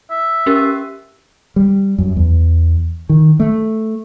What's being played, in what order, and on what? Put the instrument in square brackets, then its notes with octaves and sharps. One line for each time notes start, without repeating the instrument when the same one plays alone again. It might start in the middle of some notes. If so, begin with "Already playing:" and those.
[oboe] E5
[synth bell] C#4 G4 A#4
[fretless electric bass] G3
F#2
E2
D#3
A3